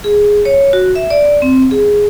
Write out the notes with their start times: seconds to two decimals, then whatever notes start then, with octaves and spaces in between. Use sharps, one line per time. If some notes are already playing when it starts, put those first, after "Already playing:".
0.04 G#4
0.45 C#5
0.73 F#4
0.96 E5
1.10 D5
1.42 C4
1.71 G#4